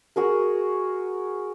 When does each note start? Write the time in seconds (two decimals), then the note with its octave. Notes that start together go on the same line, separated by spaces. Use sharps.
0.16 F#4 G#4 A#4